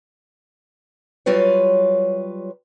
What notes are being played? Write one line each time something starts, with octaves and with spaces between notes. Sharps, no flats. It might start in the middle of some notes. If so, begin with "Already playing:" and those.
F#3 G3 F4 B4 C#5